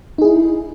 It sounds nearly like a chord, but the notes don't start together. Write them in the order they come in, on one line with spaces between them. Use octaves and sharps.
D#4 G#4 E4